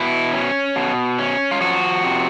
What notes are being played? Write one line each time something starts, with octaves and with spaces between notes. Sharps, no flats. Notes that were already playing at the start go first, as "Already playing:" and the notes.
Already playing: B2 E4
C#4
B2
C#4
F4
F3 F#4
C3